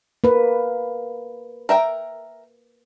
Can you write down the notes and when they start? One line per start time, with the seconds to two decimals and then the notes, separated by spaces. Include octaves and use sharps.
0.24 A#3 B4
1.69 A#4 E5 G5